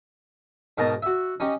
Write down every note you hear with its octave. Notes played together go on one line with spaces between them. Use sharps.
G#2 B2 D#4 A#4 A5 A#5
F#4 E5
C#4 D#4 G4